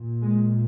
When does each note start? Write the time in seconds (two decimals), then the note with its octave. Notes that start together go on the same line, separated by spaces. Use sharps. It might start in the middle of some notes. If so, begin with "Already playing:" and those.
Already playing: A#2
0.22 G#3